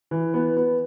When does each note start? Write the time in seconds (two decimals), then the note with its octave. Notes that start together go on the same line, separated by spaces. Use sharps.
0.11 E3
0.34 B3
0.57 B3